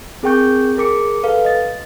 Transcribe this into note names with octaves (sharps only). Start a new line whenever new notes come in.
C4 G#4 A#4 G5 C#6 G6
G#4 A#4 D6 C#7
A4 B4 F5
D#5 A6